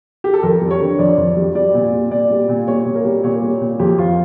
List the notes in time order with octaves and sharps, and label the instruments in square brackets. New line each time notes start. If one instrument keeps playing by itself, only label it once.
[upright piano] G4
A4
F2 A#4
G3
C#5
D3
F2 D5
F2
G3
G3 D5
A#2
G3
A#2 D5
G3
A#2
G3 C#5
A#2
A#4
G3
A#2 C#5
G3
A#2
F2 G4
F3 F4